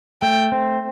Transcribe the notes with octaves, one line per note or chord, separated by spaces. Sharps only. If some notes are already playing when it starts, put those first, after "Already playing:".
A3 G5
C4